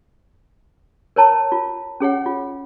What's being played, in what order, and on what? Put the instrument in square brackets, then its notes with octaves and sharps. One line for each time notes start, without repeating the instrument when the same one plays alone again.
[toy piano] A#4 C#5 A5 A#5
F4
C#4 G#4 C#5 F#5
F4